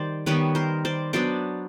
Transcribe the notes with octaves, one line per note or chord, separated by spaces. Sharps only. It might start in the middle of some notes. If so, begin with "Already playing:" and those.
Already playing: D#3 G3 C5 D5
D#3 G3 B3 B4 C#5
A#4 C5
C5 D5
F#3 B3 D4 C5 D5